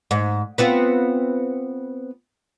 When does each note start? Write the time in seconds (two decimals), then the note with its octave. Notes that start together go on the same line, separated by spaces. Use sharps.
0.11 G#2
0.58 B3 C4 F4